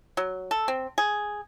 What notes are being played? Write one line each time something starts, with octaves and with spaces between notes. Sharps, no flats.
F#3
A4
C4
G#4